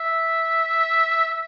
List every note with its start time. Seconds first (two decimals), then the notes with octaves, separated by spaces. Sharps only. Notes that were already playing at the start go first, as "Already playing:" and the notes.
Already playing: E5